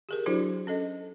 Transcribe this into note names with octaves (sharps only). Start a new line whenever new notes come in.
G4 G#4 A#4
F#3 D4 E4 F#4 G#4 C5
C#4 A4 D#5